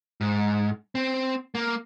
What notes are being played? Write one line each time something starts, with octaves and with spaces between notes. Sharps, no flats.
G#2
C4
A#3